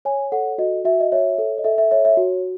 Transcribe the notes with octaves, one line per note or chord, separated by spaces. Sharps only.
C#5 G#5
A4 F#5
F#4 D#5
F#4 E5
D#5
C#5 E5
A4
D#5
A4 E5
E5
C#5 E5
E5
F#4